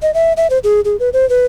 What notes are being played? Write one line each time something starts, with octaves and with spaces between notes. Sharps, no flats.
D#5
E5
E5
C5
G#4
G#4
B4
C5
B4